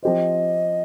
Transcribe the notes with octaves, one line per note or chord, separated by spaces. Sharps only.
F3 C4 G4 C5 D#5